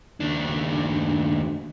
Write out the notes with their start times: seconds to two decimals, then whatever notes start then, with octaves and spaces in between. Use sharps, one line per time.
0.20 D#2 D4